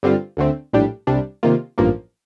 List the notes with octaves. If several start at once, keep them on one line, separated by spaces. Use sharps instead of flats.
G2 D3 G3 C4 F4
D2 D3 A3 C4
A#1 A2 G3 D4 G4
C2 C3 G3 D4
C3 D#3 A#3 F4
A1 G2 F3 A#3